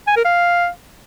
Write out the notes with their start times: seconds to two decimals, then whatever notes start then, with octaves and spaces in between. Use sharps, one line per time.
0.07 G#5
0.16 A#4
0.25 F5